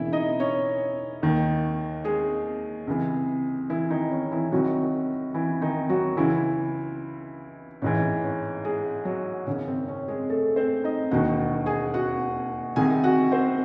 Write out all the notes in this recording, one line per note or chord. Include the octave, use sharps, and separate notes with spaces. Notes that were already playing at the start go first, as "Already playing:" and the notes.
Already playing: E1 E2 C#3 E3 E4 E5
D#4 D#5
C#4 C#5
D#2 D#3
G#3 G#4
C#2 C3 E3
E3 E4
D#3 D#4
C#4
E3 E4
C2 C3 D#3 F#3 F#4
E3 E4
D#3 D#4
F#3 F#4
C#2 C#3 E3 E4
A1 G#2 E3 C#4
C#4
G#3 G#4
F#3 F#4
G#1 F#2 C#3 C#4
C4
C#4
G#3 G#4
A3 A4
C4 C5
D#4 D#5
E1 D#2 D#3 F#4 F#5
G#4 G#5
F#4 F#5
C2 C3 D#3 G#4 G#5
F#4 F#5
C4 C5